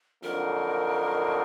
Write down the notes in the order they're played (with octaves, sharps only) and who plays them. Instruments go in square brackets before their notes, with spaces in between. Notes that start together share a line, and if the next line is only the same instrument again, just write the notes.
[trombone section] F2 D3 F#3 A#3 D#4 [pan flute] A#4